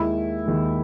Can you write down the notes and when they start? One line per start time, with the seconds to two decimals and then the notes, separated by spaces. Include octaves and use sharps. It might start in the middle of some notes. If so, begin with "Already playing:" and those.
Already playing: D#2 D#3 G#3 E4
0.46 D#2 D#3 G#3